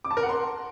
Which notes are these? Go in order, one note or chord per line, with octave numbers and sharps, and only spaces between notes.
D6
A5
A#4
F#5
C6